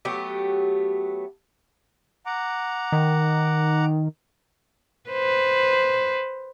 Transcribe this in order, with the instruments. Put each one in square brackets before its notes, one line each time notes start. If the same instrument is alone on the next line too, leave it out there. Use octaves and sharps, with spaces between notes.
[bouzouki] F#3 A3 B3 G4
[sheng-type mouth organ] F#5 A#5 D6
[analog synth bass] D#3
[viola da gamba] B4 C5